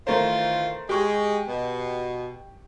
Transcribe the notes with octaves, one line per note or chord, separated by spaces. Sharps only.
D#3 E3 A3 F4 A#4 C5
G#3 G4 C#6
B2